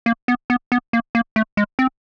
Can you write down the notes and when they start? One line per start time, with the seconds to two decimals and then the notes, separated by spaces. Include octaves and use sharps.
0.06 A#3
0.28 B3
0.50 B3
0.72 B3
0.93 A#3
1.15 A#3
1.36 A3
1.57 G#3
1.79 C4